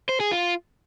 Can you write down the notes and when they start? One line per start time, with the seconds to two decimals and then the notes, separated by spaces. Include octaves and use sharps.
0.09 C5
0.20 G#4
0.32 F4